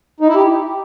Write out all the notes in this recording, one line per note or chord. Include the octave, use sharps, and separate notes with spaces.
D#4
E4
G4